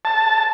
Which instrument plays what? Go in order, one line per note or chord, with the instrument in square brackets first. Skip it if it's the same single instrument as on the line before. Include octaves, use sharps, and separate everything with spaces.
[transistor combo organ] A5